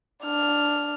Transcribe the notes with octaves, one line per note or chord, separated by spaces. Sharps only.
D4 F6